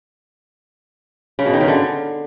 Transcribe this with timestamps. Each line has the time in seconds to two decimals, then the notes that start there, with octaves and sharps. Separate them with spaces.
1.39 C#3
1.46 B2
1.53 D#3
1.61 C#3
1.68 D3